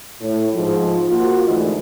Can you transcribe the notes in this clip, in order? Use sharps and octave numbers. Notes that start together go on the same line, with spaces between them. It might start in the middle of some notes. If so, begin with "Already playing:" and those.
A2
G#2 F3
A#3 F4 F#4
D2 G#2 E3 A3 D#5